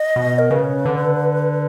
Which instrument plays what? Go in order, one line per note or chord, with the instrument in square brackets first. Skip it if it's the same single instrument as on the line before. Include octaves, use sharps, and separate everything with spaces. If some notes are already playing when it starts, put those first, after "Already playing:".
Already playing: [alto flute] D#5
[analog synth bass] B2
[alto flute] A#4
[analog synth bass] C#3 [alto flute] B4
[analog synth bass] D3